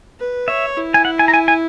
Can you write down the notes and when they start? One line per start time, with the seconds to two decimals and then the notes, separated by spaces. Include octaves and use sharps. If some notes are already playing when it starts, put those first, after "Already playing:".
0.19 B4
0.48 C#5 E5
0.77 E4
0.94 G#5
1.05 F#5
1.19 G#5
1.28 A#5
1.34 G#5
1.48 G#5